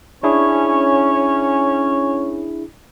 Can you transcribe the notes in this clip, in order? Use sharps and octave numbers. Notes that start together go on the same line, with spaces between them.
C#4 D4 E4 G#4 C#5